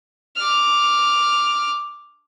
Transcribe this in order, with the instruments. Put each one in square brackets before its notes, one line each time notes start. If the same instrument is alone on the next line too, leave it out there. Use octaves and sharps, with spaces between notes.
[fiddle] D6 F6